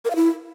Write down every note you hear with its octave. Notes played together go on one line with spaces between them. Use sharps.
A#4
F5
E4